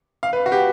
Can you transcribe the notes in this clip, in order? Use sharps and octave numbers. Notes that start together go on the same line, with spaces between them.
F5
B4
F#4
G4